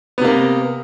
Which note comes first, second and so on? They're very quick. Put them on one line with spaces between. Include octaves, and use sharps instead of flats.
B3 C3 A#3